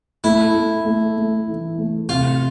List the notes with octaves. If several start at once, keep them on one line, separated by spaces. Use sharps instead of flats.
A3 E4
A3
A3
A3
E3
A3
C3 F4